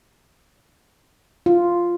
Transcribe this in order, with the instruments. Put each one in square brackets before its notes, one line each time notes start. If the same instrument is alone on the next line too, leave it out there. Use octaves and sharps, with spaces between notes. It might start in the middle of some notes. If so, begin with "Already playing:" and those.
[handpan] F4